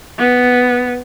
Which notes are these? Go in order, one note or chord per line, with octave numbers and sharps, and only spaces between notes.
B3